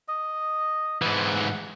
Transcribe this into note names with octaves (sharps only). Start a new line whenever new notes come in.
D#5
G#2 E3 F#5